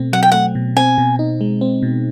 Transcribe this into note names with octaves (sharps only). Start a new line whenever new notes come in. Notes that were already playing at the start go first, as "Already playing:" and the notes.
Already playing: B2 A3 C4
F#3 F#5
G5
A3 F#5
B2
C4 G#5
B2
D#4
G#3
C4
B2